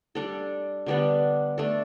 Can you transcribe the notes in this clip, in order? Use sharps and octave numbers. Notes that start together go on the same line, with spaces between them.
G3 D4 A4
D3 G3 B3 D4
A3 D4 A4